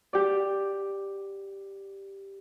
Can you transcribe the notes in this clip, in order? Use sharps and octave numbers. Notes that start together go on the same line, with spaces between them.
G4 D5